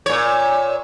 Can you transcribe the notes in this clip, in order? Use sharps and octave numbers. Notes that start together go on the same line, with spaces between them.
A#2 C#5